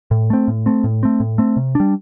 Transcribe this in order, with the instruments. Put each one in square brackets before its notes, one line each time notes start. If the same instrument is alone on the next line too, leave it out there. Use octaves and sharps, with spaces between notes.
[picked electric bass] A2
A3 C4
A2
A3 C4
A2
A3 C4
A2
A3 C4
C3
G3 D4